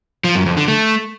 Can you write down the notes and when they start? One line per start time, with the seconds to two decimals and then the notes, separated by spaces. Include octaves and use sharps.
0.24 F3
0.35 F#2
0.46 F2
0.57 D3
0.68 A3